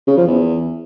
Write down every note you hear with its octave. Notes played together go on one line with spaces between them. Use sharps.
C#3
F3
E2